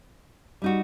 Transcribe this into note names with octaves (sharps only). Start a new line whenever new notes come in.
G3 D#4 F#4